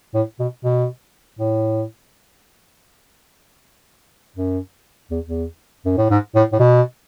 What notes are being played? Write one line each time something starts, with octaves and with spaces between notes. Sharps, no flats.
A2
B2
B2
A2
F#2
E2
E2
F#2
A2
G#2
A2
A2
B2